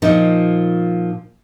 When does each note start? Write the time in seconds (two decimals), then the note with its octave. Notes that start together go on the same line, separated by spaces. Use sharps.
0.02 A#2 F3 A#3 D#4